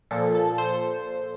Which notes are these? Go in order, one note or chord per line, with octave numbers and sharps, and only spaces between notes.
A#2 F3 A4
A4
C5